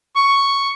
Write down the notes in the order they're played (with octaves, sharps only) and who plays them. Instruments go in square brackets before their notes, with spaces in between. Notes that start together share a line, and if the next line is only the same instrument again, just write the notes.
[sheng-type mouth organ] C#6